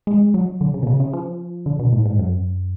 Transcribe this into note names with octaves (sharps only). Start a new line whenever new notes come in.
G#3
F#3
D3
C#3
B2
C#3
C#3
F3
D3
B2
A2
G#2
F#2